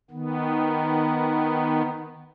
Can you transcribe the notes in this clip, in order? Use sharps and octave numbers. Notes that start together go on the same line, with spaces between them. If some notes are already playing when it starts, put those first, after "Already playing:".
D#3 B3